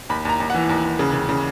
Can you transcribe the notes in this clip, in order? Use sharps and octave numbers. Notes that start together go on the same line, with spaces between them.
D#2 B5
D#2 A#5
D#2
E3 F#5
D#2
D#2
C#3
C#3
C#3